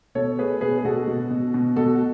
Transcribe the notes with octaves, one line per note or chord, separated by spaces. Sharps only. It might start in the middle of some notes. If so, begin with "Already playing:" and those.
B2 A4 C#5
A3 G#4 B4
B2 G#4 B4
G#4
B2 F#4 A4
B2
B2
B2
B2 F#4 A4
F#4